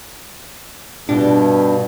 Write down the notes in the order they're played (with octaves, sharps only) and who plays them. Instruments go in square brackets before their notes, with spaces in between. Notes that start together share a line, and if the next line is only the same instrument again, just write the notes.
[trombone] G2 [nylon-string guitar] B2 G4 [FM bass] D4